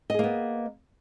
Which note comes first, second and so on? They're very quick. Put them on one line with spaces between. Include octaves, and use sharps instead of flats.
D#5 G#4 A#3 B3